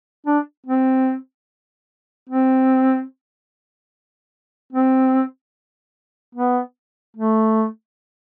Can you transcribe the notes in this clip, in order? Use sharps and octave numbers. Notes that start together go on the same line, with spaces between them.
D4
C4
C4
C4
B3
A3